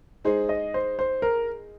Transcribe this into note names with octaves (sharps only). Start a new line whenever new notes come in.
G#3 D#4 G#4 C5
D#5
C5
C5
A#4